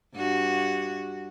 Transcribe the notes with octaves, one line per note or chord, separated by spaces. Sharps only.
G2 F#4